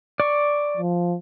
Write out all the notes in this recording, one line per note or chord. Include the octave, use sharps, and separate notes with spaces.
D5 C#6
F3